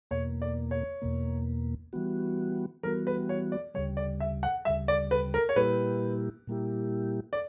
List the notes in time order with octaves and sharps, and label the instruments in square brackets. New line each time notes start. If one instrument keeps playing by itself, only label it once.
[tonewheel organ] E2 B2 A#3 [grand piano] C#5
[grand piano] D5
C#5
[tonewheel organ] E2 B2 A#3
E3 G3 B3 F#4
[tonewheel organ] E3 G3 B3 F#4 [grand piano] A#4
[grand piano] B4
C#5
D5
[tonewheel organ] D2 C#3 G3 [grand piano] C#5
[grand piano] D5
E5
F#5
[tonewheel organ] D2 C#3 G3 [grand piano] E5
[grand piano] D5
B4
A#4
C#5
[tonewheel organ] A#2 G3 A#3 E4 G4 [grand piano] B4
[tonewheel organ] A#2 G3 A#3 E4 G4
[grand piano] D5